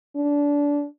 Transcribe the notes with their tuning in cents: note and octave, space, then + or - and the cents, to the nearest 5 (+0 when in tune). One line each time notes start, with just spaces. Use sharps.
D4 -25